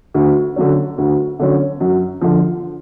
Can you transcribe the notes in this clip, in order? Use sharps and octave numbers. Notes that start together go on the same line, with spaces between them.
D2
D3 F#3 C#4
D2
D3 F#3 C#4
F#2
D3 F3